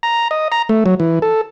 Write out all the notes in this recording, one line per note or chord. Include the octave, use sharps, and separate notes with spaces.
A#5
D#5
A#5
A3
F#3
E3
A4